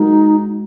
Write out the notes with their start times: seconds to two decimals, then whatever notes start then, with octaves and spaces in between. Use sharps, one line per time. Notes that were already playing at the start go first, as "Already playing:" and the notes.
Already playing: G#3 D#4 F#4 A#4